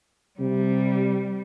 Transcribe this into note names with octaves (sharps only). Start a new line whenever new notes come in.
C3 G3